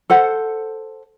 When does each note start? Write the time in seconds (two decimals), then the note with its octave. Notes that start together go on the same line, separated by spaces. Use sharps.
0.10 A4 C5 F#5